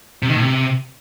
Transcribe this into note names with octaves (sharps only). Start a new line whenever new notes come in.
C3
D#3
A2
C3